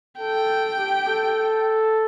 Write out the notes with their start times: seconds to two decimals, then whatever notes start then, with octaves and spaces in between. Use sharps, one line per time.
0.20 A4 G5
0.78 G4
1.07 A4